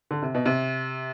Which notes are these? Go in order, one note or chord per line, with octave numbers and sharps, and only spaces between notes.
D3
C3
B2
C3